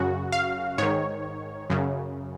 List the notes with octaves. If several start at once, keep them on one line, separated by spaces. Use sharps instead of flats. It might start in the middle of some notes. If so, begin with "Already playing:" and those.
Already playing: F#2 C#3 F#4
F5
G#2 D#3 C#5
F#2 C#3